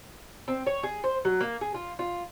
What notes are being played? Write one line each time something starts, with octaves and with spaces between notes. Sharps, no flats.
C4
C#5
G#4
C5
F#3
A#3
G#4
F4
F4